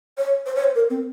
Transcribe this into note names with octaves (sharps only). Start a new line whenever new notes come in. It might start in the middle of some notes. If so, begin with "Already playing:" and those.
C#5
C5
C#5
C5
A#4
C4